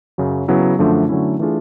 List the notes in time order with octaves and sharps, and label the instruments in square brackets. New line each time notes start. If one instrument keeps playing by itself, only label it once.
[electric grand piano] F#2 C#3 F#3
C#3 F#3 B3 E4
F#2 D3 F3 A3 D4
D3 F#3 A3 C#4 E4
E3 A3 D4 F4 G#4